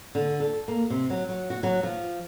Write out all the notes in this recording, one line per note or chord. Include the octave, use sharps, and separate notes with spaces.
D3
A4
A#3
C3
F#3
F#3
F#4
F#3
F3